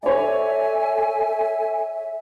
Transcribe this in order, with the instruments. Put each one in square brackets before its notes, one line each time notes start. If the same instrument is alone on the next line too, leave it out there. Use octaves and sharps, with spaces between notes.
[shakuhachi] A4 [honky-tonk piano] C#5 D5 [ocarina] E5 [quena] G#5